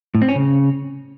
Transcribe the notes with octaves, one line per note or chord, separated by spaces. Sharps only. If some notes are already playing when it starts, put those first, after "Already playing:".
A2
C4
C#4
C#3